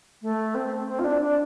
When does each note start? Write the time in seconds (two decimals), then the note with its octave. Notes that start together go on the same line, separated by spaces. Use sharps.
0.22 A3
0.55 C4
0.88 C4
0.99 F4
1.04 D4
1.21 D4